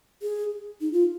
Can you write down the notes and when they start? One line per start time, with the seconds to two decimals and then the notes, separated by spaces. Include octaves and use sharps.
0.22 G#4
0.81 D#4
0.93 F4